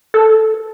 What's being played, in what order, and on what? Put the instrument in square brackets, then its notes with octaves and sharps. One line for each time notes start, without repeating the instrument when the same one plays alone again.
[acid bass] A4